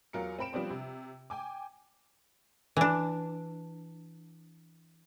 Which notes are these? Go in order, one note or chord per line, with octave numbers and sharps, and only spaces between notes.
E2 F#3 F4 A#4 C#7
C4 C5 B5 D7 E7
F3 G3 B3 C4 D4 C5
C3
G5 G#5 D6
E3 D4